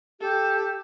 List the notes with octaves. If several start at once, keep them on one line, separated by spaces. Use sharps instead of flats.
G4 A4